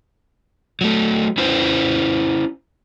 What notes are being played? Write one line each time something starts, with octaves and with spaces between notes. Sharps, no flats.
F#3 A3
C#4 E4 B4 C5